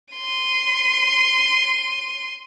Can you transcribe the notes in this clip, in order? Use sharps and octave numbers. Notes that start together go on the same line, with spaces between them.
C6 D#7